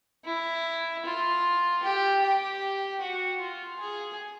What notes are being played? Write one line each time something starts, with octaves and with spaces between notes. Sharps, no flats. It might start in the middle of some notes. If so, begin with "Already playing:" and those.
E4
F4
G4
G4
F#4
F4
G#4